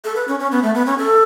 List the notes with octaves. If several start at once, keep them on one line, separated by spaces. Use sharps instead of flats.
A4
B4
C#4
C#4
B3
A3
B3
C#4
A4